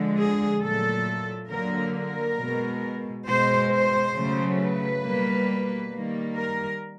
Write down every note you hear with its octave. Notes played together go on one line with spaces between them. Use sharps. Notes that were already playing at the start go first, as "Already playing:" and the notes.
Already playing: D3 F3 G#3
G#4
A#2 F#3 A3 A4
D3 F#3 A#3 A#4
A#4
B2 G#3
B2 G#3 C5
C5
C#3 F#3 A3
B4
B2 G3 A#3
D#3 G3 A#3
A#4